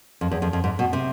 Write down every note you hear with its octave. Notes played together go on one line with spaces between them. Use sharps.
F2
E2
F2
F2
G#2
B2
C3